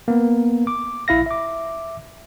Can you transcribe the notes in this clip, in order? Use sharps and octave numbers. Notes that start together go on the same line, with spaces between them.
A#3 B3
D6
A#1 E4 F5 A#6
E5 D6